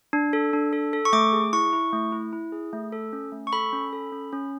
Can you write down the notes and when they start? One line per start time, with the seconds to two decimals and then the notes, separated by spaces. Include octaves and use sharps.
0.13 D4
0.33 A4
0.53 D4
0.73 A4
0.93 A4
1.05 C#6
1.13 A3 D6
1.33 G#4
1.53 E4 C#6
1.73 E4
1.93 A3
2.12 E4
2.33 E4
2.52 G#4
2.73 A3
2.92 A4
3.13 C#4
3.32 A3
3.47 C#6
3.53 A4 B5
3.73 C#4
3.93 A4
4.12 C#4
4.33 C#4